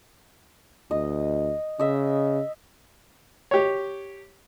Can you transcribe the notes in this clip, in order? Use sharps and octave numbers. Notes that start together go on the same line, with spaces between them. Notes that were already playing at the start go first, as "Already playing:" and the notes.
D2 D#5
C#3 D#5 E5
G4 C#5